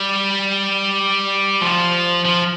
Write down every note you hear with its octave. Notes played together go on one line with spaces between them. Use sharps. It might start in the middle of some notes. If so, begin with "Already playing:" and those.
Already playing: G3
F3
F3